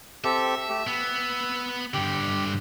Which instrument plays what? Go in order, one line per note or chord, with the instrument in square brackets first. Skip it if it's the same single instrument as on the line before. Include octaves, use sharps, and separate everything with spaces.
[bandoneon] C4 G4 A4 [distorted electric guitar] E5
[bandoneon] A3 G4
[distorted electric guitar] B3 [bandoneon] E6
[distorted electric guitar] G2 D3 [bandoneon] G4 G5